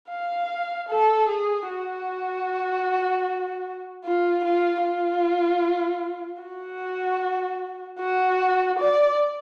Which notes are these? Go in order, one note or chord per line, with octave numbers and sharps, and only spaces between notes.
F5
A4
G#4
F#4
F4
F4
F4
F#4
F#4
D5